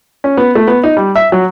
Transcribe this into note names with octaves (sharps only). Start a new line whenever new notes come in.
C#4
B3
A3
B3
D#4
G3
E5
F#3